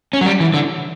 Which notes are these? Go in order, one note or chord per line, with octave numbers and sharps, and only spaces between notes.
C#4
F#3
G3
E3
D3